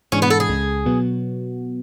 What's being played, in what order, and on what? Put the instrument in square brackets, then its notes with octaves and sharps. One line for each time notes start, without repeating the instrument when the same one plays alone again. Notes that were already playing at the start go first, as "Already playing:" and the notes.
[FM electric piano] G#2 E3 G#3 D4 [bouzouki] C#4
[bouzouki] B3
A4
G#4
[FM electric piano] C#2 C#3 G#3
B2 F#3 B3 F#4